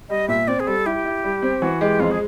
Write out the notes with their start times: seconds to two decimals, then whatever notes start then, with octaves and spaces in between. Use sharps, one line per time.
0.09 G3 D#5
0.28 A#2 E5
0.48 C4 D5
0.60 G#4
0.67 G3 A4
0.86 E4 G4
1.05 E4
1.24 G3
1.42 C4
1.62 E3 F#4
1.81 G#3 G4
2.00 F2 F4
2.11 G#4